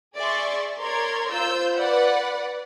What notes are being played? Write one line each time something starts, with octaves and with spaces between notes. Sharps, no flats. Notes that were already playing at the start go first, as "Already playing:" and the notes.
G#4 D5 E5 C6 C#6
A#4 C#5 D5 A#5 C6 G#6
F4 C5 E6 G6
B4 D5 F#5 B5